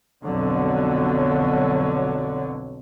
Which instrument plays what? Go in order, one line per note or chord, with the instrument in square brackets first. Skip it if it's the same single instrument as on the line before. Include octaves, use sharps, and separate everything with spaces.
[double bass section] B1 F2 D3 F#3